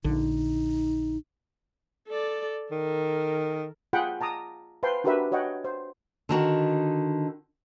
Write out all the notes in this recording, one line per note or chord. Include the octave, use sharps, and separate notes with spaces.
A#1 D3 D#4
A4 D5
D#3 A4 A#4
F4 G#4 F#5 G5 B5
A5 A#5 D6 D#6
B4 C5 F5 G5 A5 C6
D4 F#4 G4 A#4 B4 E5
F#4 C#5 D#5 F#5 G5
C5
D3 D#3 F#4